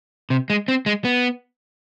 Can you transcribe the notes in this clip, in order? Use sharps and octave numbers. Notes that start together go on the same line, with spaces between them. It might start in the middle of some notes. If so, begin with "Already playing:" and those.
C3
G#3
C4
G#3
B3